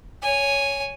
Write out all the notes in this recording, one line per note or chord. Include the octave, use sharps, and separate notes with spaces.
C#5 G#5